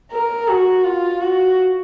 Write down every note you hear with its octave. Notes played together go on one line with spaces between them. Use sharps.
A#4
F#4
F4
F#4